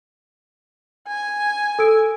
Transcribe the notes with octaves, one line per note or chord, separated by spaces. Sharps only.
G#5
A4 E6 D7